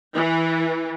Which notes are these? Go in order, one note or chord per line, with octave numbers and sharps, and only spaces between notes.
E3